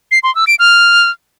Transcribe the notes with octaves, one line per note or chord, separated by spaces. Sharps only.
C7
C6
E6
D7
F6